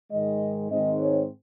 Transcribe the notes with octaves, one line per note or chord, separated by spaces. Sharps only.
G#2 D#3 G#3 D#5
G#2 D#3 G#3 C4 D#5
C#5